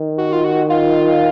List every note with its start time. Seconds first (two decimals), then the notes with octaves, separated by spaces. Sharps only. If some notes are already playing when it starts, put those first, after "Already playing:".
Already playing: D#3
0.18 F#4
0.33 F4
0.44 F#4
0.70 F4